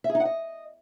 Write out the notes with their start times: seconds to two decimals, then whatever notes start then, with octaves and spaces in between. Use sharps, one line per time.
0.04 E5
0.10 G#4
0.15 D#4
0.20 F#5
0.25 D#5